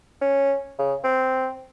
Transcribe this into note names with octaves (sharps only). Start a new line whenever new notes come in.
C#4
C#3
C4